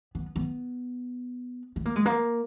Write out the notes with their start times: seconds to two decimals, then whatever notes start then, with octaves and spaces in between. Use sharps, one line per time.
0.15 B3
0.36 B3
1.76 B3
1.85 A#3
1.96 G#3
2.06 A#3